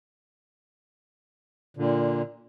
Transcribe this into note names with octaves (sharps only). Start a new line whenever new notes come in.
A#2 D3